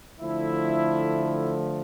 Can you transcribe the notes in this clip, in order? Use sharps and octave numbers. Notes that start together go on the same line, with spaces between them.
D3 F3 A3 E4